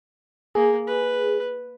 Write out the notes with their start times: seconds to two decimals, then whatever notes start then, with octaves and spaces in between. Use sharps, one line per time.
0.55 A#3 G#4
0.87 B4